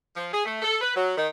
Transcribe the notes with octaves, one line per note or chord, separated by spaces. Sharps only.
F3
G#4
A3
A4
B4
F#3
D#3